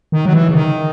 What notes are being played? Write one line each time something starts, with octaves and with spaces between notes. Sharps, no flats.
D#3
F#3
E3
C#3
D#3